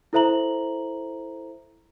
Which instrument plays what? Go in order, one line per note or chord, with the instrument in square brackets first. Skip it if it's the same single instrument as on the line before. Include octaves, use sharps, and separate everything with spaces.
[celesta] E4 A4 C5 E5 A#5 F#7